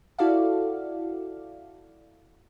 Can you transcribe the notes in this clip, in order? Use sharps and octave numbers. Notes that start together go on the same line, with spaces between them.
E4 F#4 A4 D5 F5